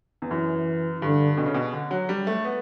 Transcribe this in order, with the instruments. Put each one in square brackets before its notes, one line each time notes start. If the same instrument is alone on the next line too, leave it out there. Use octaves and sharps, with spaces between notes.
[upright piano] E2
[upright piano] F#2 [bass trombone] E3
[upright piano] G2 [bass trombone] D3
[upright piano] B2
C#3
B2
D3
F#3
G3
A3
B3